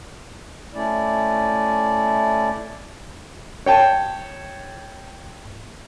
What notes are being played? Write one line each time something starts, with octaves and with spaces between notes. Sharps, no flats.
A3 C#4 E4 D5
C#5 G5 A5